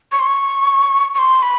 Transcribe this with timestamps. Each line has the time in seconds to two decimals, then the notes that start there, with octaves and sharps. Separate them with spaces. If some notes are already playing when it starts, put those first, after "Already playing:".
0.12 C#6
0.20 C6
0.27 C#6
1.15 C#6
1.19 C6
1.42 B5